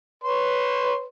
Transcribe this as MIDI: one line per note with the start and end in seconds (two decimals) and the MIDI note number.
0.24 1.03 71
0.24 1.03 73
0.24 1.03 84